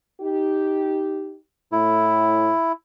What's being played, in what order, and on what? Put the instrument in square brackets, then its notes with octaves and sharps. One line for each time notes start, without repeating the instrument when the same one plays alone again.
[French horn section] D#4 G4
[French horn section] A2 [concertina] E4